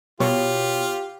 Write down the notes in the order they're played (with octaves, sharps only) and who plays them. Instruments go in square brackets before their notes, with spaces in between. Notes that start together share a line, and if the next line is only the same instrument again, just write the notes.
[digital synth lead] B2 [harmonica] F4 [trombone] G4 [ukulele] C#5